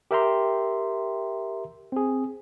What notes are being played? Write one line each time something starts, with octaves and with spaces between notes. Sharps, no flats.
G4 A#4 E5 G5 A#5 C6
C4 G#4